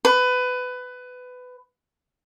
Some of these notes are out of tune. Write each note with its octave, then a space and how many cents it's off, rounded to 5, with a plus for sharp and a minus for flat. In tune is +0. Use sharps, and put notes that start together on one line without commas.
B4 +20